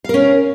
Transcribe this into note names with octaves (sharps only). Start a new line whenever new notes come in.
C#4 A#4 F5